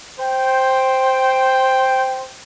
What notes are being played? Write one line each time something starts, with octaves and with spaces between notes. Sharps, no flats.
C5 G5